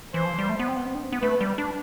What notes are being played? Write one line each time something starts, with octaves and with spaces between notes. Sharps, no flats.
E3 C5
F3
G3
A3
B3
C4
B3
C4
D4
C4
B3
A3 B4
G3
D4